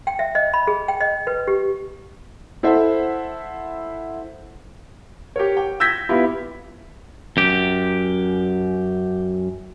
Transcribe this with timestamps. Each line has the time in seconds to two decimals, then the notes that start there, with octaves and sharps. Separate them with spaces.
0.07 G5
0.19 E5
0.35 D#5
0.54 B5
0.67 G#4
0.88 G5
1.00 D#5
1.27 B4
1.47 G4
2.63 E4 A4 C5 E5 F#5
5.36 G4 A#4 C#5
5.57 G5
5.80 E6 G6 G#6 A#6 B6
6.09 B3 E4 F4 G4
7.37 F#2 G4